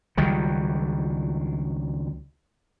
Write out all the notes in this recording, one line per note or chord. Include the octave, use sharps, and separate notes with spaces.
C#2 D#3 F#3 G3